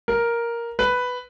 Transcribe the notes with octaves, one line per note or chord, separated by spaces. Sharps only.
A#4
B4